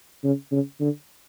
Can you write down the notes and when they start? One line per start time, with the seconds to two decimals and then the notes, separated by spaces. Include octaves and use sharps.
0.24 C#3
0.52 C#3
0.80 D3